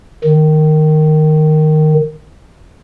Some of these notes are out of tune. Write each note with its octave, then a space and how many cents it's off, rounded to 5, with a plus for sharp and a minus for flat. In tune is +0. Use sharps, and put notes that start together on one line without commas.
D#3 -10